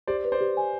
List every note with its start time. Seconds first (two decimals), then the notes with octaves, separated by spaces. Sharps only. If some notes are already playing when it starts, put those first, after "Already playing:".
0.07 G4 C5 D5
0.25 B4
0.32 C5 D5
0.41 G4
0.57 G#5